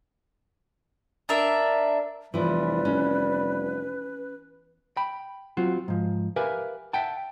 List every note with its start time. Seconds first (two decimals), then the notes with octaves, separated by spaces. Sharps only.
1.29 D4 A#4 E5
2.34 F1 E3 F3 G3 B4
2.85 C#4
4.97 G5 B5
5.57 F#3 C4 F4 F#4
5.88 G#2 F3
6.36 G4 A#4 B4 E5 F5 G#5
6.93 E5 F#5 G5 A5